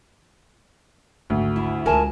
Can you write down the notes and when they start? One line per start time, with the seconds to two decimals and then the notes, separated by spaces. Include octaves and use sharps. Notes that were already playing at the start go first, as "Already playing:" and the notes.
1.30 G#1 D2
1.56 E4
1.86 C#2 G#3 A#4 G#5 A5